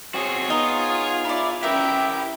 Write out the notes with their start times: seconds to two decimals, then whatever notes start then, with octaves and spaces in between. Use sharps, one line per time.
0.14 C4 F#4 G#4 C#5
0.50 B3 D#4 F4 D#5
1.25 E4 D5
1.63 C#4 E4 G4 A#4 B4 E5 G5